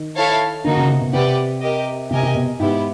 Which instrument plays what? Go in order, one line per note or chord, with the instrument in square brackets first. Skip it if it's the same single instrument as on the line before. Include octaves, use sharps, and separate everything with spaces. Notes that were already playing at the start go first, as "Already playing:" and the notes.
Already playing: [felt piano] D#3
[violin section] E4 A4 C#5 F5 A5
[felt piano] D3 [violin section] A#3 D#4 F#4
[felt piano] C#3
C3
B2
[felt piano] C3 [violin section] G4 B4 D5 F#5
[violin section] G4 A#4 D#5
[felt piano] C3 [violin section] G4 A#4 D#5 G#5
[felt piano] C3
B2
[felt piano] G#2 [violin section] B3 E4 G4